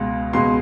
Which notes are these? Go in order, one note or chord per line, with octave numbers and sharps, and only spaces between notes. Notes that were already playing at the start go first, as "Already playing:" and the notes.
Already playing: C#2 B2 G#3
C#2 B2 G#3 C6